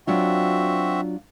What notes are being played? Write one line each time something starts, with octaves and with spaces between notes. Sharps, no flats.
F#3 C4 D4 F4 F#4 E5